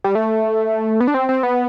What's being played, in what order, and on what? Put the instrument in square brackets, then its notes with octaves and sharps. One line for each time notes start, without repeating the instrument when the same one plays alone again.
[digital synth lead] G3
A3
B3
D4
C4
C4
B3